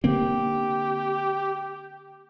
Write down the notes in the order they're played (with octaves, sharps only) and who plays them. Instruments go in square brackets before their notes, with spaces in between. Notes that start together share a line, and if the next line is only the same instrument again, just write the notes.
[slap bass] D3 A#3 C4 [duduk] G4